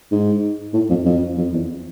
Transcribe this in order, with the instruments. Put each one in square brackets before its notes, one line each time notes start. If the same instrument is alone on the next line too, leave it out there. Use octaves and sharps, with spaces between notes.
[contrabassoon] G#2
A2
F2
F2
F2
E2